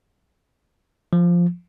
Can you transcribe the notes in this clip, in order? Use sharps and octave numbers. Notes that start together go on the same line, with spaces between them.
F3